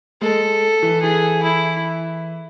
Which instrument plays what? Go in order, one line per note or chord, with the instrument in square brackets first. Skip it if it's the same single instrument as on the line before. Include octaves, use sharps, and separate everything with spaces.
[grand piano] G#3 [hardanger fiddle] A4
[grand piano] E3
[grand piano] E3 [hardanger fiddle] G#4
[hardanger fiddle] E4